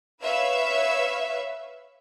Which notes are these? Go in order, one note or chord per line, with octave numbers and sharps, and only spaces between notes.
B4 C#5 E5 F5 E6